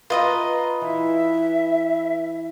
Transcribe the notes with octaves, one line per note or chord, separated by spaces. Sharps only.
F4 B4 D#5 A#5
E3 E5